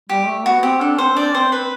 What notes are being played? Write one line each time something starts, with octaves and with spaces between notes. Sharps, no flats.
G3 G4
A3
B3 F#4
B3
C4 G4
D4 A4
C4 C5
D4 D5
C4 C5
B4